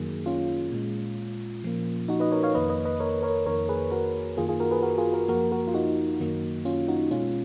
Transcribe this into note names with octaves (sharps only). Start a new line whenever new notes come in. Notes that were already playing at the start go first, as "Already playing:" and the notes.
Already playing: F#2 D#3 F#3 A#3 G#4
C#4 F4
A#2 G#3
A#2 F3 A#3
D#4 F#4
B4 D#5
A#4 C#5
C#5 F5
F2 D#3 A#3 B4 D#5
B4 D#5
B4 D#5
A#4 C#5
A#4 C#5
F2 D#3 A#3 A#4 C#5
G#4 B4
F#4 A#4
F#2 D#3 A#3 F4 G#4
F4 G#4
F#4 A#4
G#4 B4
F#4 A#4
F4 G#4
F#4 A#4
F#2 F3 A#3 F#4 A#4
F#4 A#4
F4
D#4 F#4
F#2 D#3 F#3 A#3
C#4 F4
D#4 F#4
B2 G#3 C#4 F4